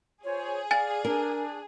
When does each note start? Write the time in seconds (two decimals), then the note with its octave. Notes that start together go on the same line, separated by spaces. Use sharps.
0.24 F4 G#4 C5 C#5
0.71 D5 F5 G#5 A6
1.05 D4 A#4